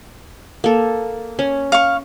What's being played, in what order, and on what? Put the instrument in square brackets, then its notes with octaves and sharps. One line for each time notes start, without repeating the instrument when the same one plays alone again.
[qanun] A#3 A4
C#4
[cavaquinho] F5 C#6